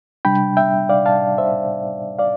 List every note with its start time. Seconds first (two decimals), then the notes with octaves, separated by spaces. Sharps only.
0.25 C3 G3 D4 G5 B5
0.57 E5 G5
0.89 D5 F5
1.06 F5 A5
1.38 C5 E5
2.19 D5 F5